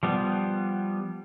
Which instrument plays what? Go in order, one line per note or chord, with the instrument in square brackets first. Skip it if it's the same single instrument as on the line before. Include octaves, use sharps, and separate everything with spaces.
[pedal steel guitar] F3 G3 B3